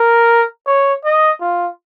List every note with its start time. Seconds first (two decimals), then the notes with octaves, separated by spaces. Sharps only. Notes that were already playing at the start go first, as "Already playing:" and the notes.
Already playing: A#4
0.67 C#5
1.05 D#5
1.41 F4